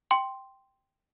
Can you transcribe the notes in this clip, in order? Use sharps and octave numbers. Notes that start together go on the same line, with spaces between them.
G5 C6